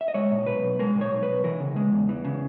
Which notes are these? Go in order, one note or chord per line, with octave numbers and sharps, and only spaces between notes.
E5
D#5
G#3 C#5
A#2
B1 B4
B1
G#3 A#4
A#2
C#5
B1
B4
B1
E3 A#4
C#3
G#3
E2
E3
C#3